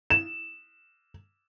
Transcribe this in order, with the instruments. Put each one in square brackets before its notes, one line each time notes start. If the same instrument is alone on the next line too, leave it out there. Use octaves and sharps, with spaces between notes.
[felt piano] E7